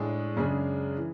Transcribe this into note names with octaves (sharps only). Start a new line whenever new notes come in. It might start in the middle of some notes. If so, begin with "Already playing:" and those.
Already playing: A2 G#3 D4 G#4
F#2 C#3 G#3 D4 G#4
E3